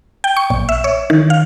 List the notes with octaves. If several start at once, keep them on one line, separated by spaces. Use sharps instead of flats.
G5
C#6
A#1
E5
C#5
D#3
F5